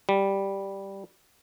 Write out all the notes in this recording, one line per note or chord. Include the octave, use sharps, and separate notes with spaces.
G3